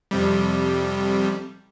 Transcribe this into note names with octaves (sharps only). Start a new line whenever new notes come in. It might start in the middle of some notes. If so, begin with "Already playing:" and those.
F2 C3 G3